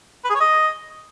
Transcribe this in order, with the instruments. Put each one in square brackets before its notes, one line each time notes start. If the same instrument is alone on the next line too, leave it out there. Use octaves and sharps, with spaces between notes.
[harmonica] B4
G#4
C#5
D#5